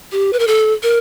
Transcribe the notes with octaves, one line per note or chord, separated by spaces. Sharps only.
G4
B4
A#4
A4
A#4